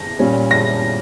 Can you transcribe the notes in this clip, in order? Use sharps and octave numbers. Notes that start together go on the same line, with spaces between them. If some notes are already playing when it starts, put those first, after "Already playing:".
Already playing: A#6
A#2 G3 C#4
A#6